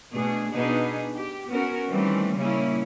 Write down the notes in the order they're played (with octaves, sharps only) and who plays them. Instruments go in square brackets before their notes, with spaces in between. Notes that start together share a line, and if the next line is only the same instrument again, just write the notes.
[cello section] B2 A3 D4 G#4
B2 B3 D4 D#4 G#4 B4
G4
B3 C#4 F#4 A#4
D#3 E3 G3 A3 C4 C#4
A#2 C#3 G3 A#3 C#4 E4